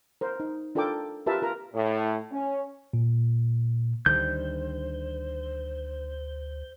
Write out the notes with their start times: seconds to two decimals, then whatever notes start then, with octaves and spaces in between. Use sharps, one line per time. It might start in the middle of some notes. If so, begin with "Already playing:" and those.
0.21 A#4 C5
0.40 D#4
0.75 D4 F4 A4 A#4 G5 D6
1.27 F4 G4 A#4 B4 E5 A5
1.42 F4 A#4 A#5
1.74 A2
2.32 C#4
2.93 A#2
4.06 D2 D3 D#3 G3 C5 G6